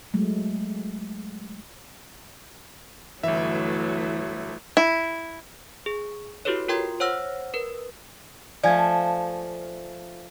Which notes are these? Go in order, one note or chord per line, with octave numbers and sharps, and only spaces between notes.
F#3 G#3 A3
G1 E3 F#3 A3 E5
E4
G#4
E4 F#4 G4 A4 B4 C#5
F4 A#4 G5 C6 G#6
C5 C#5 F#5 E6 F6 A#6
A#4 B4
F3 A3 D5 G#5 G#6